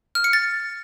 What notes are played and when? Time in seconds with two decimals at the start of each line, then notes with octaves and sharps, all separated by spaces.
0.15 F6
0.24 C#7
0.33 A6